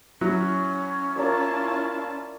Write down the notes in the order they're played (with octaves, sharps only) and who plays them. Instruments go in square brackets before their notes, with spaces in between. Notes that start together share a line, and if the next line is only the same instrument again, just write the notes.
[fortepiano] F#3 [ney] C#4 [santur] E4
[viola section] E4 F4 A5 [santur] A#4 C#5 D5